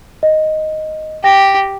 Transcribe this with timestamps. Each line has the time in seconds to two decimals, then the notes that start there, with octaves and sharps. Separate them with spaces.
0.23 D#5
1.24 G4 G5 A#6